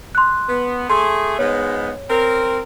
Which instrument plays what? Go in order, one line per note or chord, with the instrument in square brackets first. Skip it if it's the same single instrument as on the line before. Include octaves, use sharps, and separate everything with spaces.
[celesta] C6 F#6
[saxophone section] B3
[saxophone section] A3 G#4 [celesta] C6
[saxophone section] G#2 G#3 B3 [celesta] C#5
[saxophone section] C4 A#4